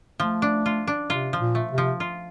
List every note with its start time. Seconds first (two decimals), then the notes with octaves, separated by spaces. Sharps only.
0.20 F3 A3
0.42 D4
0.66 F4
0.87 D4
1.10 C3 F4
1.33 F3
1.40 A#2
1.55 A3
1.71 C3
1.78 F3
2.00 F4